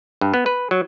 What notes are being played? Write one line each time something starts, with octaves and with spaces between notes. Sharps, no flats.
G2
B3
B4
F#3